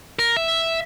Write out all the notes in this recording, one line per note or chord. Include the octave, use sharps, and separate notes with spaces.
A#4
E5